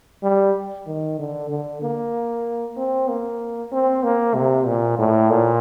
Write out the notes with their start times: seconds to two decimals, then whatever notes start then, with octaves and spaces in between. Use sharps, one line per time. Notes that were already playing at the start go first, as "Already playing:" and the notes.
0.23 G3
0.86 D#3
1.19 D3
1.50 D3
1.82 A#3
2.77 C4
3.08 A#3
3.72 C4
4.03 A#3
4.35 C3
4.66 A#2
4.99 A2
5.30 A#2